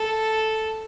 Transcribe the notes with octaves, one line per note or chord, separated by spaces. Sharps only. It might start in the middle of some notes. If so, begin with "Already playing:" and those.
Already playing: A4